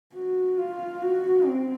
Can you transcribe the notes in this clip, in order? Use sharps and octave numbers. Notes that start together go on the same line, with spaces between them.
F#4
F4
F#4
C4